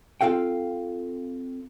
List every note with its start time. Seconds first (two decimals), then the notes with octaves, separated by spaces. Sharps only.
0.21 C4 F4 A4 F5 G5